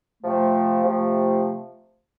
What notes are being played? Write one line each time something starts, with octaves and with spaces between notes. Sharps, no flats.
C3 F3 A3
C3 F3 A3